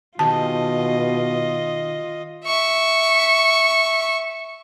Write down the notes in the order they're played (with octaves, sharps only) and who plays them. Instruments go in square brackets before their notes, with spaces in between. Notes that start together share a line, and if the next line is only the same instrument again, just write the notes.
[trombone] B2 [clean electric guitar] D#3 G4 G#4 [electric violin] F4 D#5 [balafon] A5
[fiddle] E5 C#6